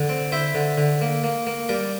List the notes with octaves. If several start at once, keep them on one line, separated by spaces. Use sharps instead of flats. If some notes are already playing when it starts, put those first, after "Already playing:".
Already playing: D3
C4
E4 C5 E5
D3
D3
A#3
A#3
A#3
G3 A#4 D5